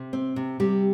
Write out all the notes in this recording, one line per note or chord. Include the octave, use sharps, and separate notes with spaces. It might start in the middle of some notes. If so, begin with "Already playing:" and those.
Already playing: C3
C4
C3
C3 G3 G4